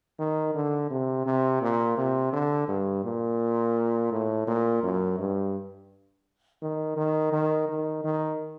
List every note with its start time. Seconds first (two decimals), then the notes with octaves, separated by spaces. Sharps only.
0.19 D#3
0.54 D3
0.90 C3
1.26 C3
1.62 A#2
1.97 C3
2.33 D3
2.68 G2
3.05 A#2
4.12 A2
4.47 A#2
4.83 F#2
5.19 G2
6.62 D#3
6.96 D#3
7.33 D#3
7.69 D#3
8.04 D#3